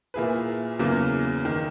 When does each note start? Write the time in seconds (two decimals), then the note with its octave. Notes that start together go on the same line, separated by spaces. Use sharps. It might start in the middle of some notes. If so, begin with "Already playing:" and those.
0.14 A#2 A#3 E4 G#4 B4
0.79 E2 C#3 F#3 A#3
1.45 D#3